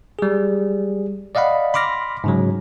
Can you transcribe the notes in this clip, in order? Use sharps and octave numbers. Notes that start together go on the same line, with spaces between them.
G3 G#4
D5 D#5 F5 F#5 B5
B5 C6 D6 F6 A#6
G#2 C#3 F#3